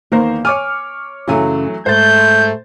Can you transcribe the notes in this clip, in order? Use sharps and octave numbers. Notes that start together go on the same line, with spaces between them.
E2 D#3 A#3 A#4 C5
C#5 G#5 D6 F6
F#2 C#3 E3 F#3 A3 G#5
G#2 A3 C5 G6 A6